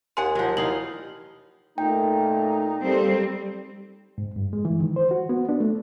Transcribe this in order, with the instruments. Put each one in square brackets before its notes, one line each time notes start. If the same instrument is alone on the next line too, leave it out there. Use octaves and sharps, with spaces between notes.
[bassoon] D#2 [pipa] G#4 F#5 [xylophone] G#5 C6
[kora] F3 F#3 [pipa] G#3 F#5
[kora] E3 D#4 F5 [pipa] G3 [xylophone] F#7
[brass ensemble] A#2 A3 [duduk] D#4 [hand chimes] G5
[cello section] G3 C4 [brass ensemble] A#3 A4
[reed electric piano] G#2
G2
G#3
E3
D#3
C5
F#4
B3
D4
A3